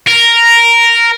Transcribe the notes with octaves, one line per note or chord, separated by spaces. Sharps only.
A#4